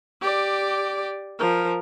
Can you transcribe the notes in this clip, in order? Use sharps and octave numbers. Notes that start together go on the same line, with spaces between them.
G4 D5
F3 A#4